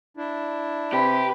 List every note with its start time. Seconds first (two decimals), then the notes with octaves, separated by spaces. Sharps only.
0.17 D4 E4
0.93 C3 G4 B4